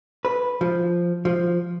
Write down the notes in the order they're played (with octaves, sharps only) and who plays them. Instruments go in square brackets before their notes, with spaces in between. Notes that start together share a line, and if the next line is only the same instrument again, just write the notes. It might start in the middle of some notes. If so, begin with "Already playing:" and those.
[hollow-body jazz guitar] B4
F3
F3